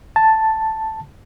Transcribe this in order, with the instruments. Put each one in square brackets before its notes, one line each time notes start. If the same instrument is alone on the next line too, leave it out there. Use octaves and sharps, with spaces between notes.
[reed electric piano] A5